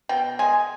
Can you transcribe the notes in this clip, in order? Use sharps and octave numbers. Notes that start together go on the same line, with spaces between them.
B2 G5
G#3 G#5